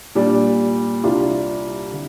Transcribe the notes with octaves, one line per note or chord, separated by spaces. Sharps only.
A#2 G3 D4
C2 C3 G3 D4 F4
D3